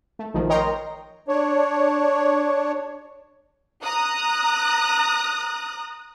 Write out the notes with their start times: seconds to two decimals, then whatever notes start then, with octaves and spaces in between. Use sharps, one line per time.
0.19 A3
0.34 A#1 D#3 F3 A3
0.49 A#4 C#5 D#5 G5 A#5 C6
1.28 D4 C#5
3.83 A#5 D#6 F#6